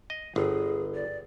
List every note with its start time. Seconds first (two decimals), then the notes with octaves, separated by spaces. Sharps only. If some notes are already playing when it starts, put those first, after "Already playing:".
0.10 D#5
0.36 G1 G#4
0.94 D5